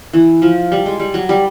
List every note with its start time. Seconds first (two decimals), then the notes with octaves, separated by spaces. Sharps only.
0.13 E3
0.42 F3
0.72 G3
0.86 G#3
0.99 G3
1.14 F#3
1.29 G3